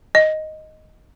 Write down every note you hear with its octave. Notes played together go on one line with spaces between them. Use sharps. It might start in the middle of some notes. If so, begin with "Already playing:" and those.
D#5